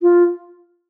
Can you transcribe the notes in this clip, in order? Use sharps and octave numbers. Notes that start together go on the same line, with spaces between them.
F4